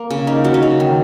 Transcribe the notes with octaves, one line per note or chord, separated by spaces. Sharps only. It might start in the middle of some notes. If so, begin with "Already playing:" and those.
Already playing: A#3
C#3
A#3 D#4
F#3 F#4
D#4
C#3
D#3